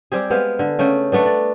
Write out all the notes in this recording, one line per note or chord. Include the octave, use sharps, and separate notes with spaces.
G3 C4 G4 G#4
G#3 B3 C5 F5
D3
C#3 A3 G5
A3 B3 D4
D5